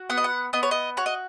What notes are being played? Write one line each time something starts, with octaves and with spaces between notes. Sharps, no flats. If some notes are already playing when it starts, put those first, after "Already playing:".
Already playing: F#4
B3 F#5
D#5
F#5
B3 D#5
C#5
D#5
F#4 C#5
D#5